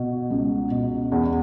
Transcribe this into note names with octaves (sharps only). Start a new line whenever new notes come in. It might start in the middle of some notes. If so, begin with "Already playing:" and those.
Already playing: B2
C#2
B2
E2